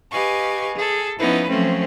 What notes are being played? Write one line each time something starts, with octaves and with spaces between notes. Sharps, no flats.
G4 B4 D#5 F5 G#5 C#6
G#4 A4
F3 B3 C#4 D#4 E4 B4
F3 F#3 A3 C4 C#4